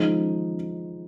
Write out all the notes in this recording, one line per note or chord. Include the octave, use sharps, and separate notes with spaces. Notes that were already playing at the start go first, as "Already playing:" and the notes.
Already playing: F3 G#3 D#4